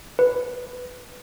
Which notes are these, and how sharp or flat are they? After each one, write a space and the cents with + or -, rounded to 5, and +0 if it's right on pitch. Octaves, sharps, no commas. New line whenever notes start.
B4 +10